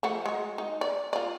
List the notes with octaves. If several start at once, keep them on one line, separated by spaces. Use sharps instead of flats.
F3 A3 F#5
G#3 F#4
D#4
D5
F4 D5